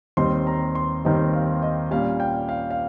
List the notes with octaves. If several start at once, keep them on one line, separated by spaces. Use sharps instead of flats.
D#2 D#3 G3 C4 D#4 C6
A#5
C6
D#2 D#3 G3 C4 D#4
F5
D#5
A#2 G3 C#4 F5
G5
F5
F5